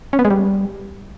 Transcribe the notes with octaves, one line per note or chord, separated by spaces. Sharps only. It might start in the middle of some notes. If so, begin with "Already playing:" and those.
C#4
B3
G#3
G3